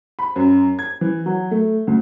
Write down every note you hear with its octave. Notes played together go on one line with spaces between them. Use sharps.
B5
F#2
G#6
E3
F#3
A3
D2